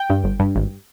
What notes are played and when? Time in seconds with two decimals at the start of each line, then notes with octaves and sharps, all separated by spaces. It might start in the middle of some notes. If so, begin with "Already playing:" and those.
Already playing: G5
0.10 G2
0.24 G1
0.40 G2
0.56 G#1